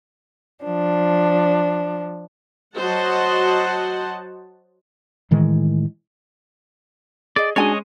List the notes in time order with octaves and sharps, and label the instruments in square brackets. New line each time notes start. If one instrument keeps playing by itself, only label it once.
[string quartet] F3 D4
[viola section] F#3 F#4 C5 D#5 F#5 A5
[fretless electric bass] A2 D#3 E3 G#3
[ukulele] G#4 D#5 [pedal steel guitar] D5
[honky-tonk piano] G#3 C#4 G#4 [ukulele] D4 F#4 G#5 [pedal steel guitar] C#5 D#5